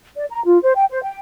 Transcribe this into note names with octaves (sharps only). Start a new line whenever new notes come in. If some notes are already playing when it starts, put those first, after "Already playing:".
D5
A#5
F4
C5
G5
C5
G5